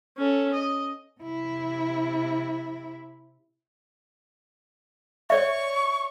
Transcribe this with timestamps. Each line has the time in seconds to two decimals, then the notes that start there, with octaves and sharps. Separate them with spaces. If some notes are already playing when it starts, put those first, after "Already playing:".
0.17 C#4 A4
0.53 D#5
1.20 C3 E4
5.30 C#5 D5 E5 C#6